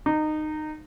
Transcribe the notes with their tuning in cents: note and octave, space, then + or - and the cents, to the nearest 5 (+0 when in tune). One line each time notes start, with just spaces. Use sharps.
D#4 -20